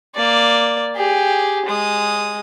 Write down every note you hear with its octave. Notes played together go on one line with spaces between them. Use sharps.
A#3 D5
G4 G#4
G#3 D#6